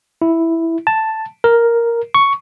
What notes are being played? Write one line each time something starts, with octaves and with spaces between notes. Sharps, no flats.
E4
A5
A#4
C#6